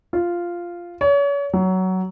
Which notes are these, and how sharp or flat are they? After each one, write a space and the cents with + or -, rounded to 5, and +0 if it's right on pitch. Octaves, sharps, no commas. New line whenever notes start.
F4 -5
C#5 +35
F#3 +15